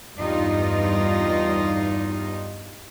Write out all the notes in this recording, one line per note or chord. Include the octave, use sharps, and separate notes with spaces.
E2 G2 G3 D#4 F4